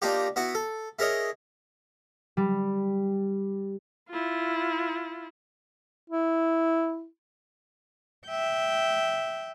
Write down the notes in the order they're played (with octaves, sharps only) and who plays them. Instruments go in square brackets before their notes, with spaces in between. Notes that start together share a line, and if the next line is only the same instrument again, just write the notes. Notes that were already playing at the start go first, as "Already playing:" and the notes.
[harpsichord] A#3 D4 D#4 F4 G4
B3 E4 F#4 F#5
A4
E4 G#4 A#4 C#5 D#5
[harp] G3
[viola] E4 F4
[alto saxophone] E4
[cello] E5 G5